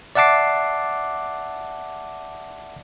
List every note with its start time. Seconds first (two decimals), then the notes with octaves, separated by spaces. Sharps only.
0.15 D5 E5 F#5 A5 D6 C7